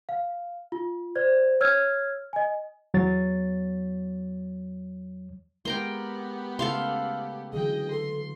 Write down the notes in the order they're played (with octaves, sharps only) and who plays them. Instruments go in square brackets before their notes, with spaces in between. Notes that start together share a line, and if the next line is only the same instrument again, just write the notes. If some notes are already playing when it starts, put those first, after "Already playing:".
[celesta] F5
F4
C5 D5 G#6
C#5 E6 F6 G#6
D#5 G#5
[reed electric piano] E2 F#3 C#5 A6
[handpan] G#3 A#4 [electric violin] B3 G4 [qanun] G5 A#5 C6
[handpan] C#3 A3 [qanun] A4 F5 C6
[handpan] D3 E3 F#3 [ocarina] G#4 [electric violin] D#5 G5
[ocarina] A4 [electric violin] C6